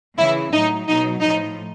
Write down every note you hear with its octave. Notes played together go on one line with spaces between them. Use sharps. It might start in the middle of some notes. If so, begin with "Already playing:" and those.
C#3 E3 E4
A2 F#3 D#4
B2 F#3 D#4
A2 F3 D#4